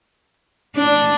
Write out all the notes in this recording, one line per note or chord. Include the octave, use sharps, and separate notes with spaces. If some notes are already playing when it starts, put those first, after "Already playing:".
D4